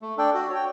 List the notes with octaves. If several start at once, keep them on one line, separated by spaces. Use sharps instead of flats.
A3
D4 A4 D5 G5
F#4
C#5 G5